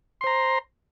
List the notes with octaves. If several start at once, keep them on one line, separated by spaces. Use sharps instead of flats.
C5 A#5 C6